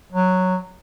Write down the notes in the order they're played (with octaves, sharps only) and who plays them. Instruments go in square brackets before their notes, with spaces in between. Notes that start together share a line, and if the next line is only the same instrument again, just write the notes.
[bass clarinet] F#3